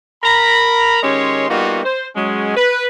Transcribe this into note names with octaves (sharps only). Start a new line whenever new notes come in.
A#4 A#5 B5
D#3 G#3 C#4 G4 C#5 C6
G3 A#3 B3 D#4 F4 F#4
C5
F#3 G#3 C#4
B4